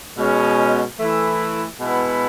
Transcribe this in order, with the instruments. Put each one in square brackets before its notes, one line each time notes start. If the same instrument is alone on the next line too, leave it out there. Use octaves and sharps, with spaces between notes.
[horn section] B2 G#3 C#4
E3 A3 E4
B2 G#3 B3 E4